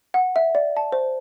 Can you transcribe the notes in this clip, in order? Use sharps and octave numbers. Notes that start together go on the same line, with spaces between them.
F#5
E5
D5
A5
C5